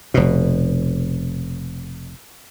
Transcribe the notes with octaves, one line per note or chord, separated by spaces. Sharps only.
F1 B2